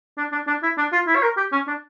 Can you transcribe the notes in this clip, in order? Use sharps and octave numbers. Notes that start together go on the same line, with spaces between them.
D4
D4
D4
E4
D4
F4
E4
C#5
A#4
G4
C#4
D4